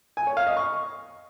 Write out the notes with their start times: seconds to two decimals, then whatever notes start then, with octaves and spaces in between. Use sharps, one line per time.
0.17 G#5
0.27 C#5
0.37 F5
0.47 D#5
0.57 C#6